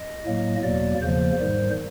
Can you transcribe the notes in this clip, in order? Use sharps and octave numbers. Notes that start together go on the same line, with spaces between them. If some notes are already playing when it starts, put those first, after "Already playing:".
Already playing: D#5
A2 F#3 A#3
E2 B2 F#3 A#3 D5
E2 C#3 F3 A#3 C5
G#2 D#3 G3